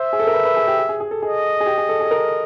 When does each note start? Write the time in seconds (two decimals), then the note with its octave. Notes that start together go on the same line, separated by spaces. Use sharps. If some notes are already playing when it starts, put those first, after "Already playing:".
Already playing: C5 E5
0.13 G#4
0.20 A4
0.27 A#4
0.34 B4
0.45 B4
0.56 G#4
0.67 G4
0.78 G#4
0.89 G#4
1.00 G#4
1.11 A4
1.22 G#4 D#5
1.60 G#4
1.66 G4
1.78 G#4
1.89 A4
2.00 G#4
2.06 A4
2.11 A#4